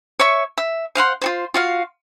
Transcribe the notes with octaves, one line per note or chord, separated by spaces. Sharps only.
C#5 E5 C#6
E5
C5 F5 F#5 C6
F4 F#4 C5
F4 F#4 F5